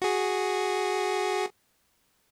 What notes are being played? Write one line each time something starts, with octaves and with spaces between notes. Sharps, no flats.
F#4 G#4